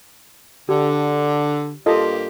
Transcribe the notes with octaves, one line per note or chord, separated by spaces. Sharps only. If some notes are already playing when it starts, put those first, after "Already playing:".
D3 G4
G2 A#3 F4 G4 A4 D#5